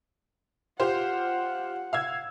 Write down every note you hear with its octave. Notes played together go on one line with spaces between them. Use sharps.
F4 G4 C5 F#5
F5 E6 G#6